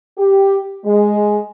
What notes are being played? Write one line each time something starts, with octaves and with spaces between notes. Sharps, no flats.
G4
G#3